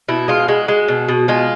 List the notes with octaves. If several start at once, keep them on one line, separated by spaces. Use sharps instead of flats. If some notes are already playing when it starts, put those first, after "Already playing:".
B2 E4
G#3 F4
G#3 F#4
G#3
B2
B2
G#3 F4